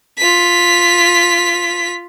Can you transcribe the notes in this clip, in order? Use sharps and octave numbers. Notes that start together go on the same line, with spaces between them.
F4 B6